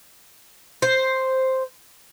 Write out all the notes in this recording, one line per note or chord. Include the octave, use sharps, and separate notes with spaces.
C5